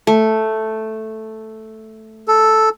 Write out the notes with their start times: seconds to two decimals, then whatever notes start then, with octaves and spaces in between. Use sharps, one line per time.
0.07 A3
2.28 A4